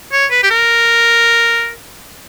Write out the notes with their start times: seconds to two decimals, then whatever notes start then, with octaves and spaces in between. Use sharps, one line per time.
0.12 C#5
0.31 B4
0.43 G4
0.50 A#4